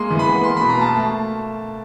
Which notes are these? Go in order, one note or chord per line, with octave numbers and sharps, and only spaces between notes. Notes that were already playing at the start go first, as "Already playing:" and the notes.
Already playing: G#3 A#3 C6
E3
B5
B3
A#3 C6
B2 B5
A#5
A#3 A5
A3